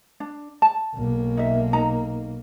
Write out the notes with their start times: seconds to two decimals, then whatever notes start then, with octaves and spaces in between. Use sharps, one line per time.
0.20 D4
0.62 A5
0.94 B1 A#3
1.37 D#4 E5
1.73 D#4 A#5